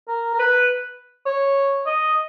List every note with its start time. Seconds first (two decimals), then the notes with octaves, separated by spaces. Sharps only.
0.08 A#4
0.34 A#4
0.39 B4
1.26 C#5
1.86 D#5